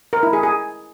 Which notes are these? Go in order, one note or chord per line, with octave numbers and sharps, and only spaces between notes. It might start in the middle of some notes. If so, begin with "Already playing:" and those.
A#4
E4
G#4
G#4